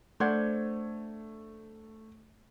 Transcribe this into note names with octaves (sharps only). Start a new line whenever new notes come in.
A3 D4 C5 F#5 G#6